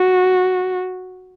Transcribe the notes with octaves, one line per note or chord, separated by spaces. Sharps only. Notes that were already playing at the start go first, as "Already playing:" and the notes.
Already playing: F#4